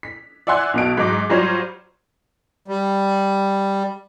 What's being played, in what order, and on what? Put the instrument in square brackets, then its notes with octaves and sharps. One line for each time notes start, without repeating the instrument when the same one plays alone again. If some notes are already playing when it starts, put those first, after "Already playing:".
[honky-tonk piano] B6
D5 E5 F#5 G#5 C6 F#6
B1 B2 D7
G#2 F#3 D#4 D6
F#3 G3 F4 C5 C#5
[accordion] G3